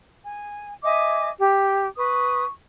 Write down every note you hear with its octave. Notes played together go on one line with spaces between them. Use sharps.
G#5
D#5 E5 G#5 D6
G4
B4 C#6 D#6